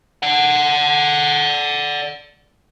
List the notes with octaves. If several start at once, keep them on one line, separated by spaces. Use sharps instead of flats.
D5 F#5